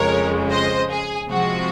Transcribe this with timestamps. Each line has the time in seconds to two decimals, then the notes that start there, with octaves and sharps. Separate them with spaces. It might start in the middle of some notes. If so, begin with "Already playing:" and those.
Already playing: F2 C#3 G#3 A#4 C#5
0.50 C5 D#5
0.89 G#4
1.28 C3 F3 G#3 F#4